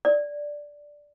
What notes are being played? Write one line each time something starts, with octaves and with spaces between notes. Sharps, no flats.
D5